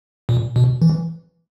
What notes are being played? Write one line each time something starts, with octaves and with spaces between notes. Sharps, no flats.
A#2
B2
E3